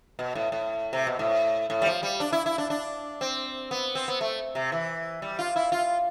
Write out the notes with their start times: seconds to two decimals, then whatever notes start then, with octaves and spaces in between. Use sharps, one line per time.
0.19 B2
0.35 A2
0.52 A2
0.93 C3
1.07 B2
1.19 A2
1.70 A2
1.82 G3
1.86 F3
2.03 G3
2.20 D4
2.33 E4
2.46 E4
2.58 D4
2.70 D4
3.21 C4
3.71 B3
3.95 C4
4.08 B3
4.21 A3
4.55 C3
4.72 E3
5.22 G3
5.39 F4
5.56 E4
5.72 F4